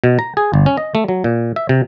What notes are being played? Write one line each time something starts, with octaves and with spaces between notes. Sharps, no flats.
B2
A#5
G#4
G1
C#4
D#5
A3
F#3
A#2
E5
C3